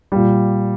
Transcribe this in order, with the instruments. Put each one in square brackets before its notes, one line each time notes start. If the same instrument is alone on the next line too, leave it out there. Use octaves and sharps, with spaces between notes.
[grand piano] A#2 G3 G4